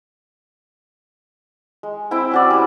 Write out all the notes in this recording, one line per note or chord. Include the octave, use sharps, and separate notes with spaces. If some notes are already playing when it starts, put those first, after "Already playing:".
G#3
C4 E4 G5 B5
C#4 F#4 D5
G3 C#4